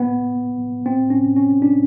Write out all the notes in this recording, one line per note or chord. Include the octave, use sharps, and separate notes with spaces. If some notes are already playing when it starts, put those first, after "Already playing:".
Already playing: B3
C4
C#4
C#4
D4